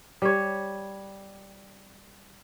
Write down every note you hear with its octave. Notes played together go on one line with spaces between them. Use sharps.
G3 C#5